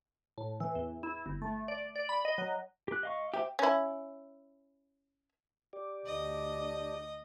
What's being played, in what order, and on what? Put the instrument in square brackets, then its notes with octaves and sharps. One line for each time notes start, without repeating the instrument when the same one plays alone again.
[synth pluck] A2
E3
E2
E4
G1
A3
D5
D5
B5
D#5
F#3
[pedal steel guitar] G4 F#6
D#5 F5 C#6
[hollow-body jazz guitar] G4 [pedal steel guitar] C5 E5
[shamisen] C#4 E4
[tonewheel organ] G4 D5
[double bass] D2 D4 [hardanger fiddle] D#5